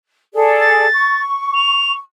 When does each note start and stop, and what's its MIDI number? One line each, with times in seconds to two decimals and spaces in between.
0.34 0.87 68
0.34 0.87 69
0.34 0.87 74
0.60 1.22 93
0.93 1.98 85
1.55 1.93 101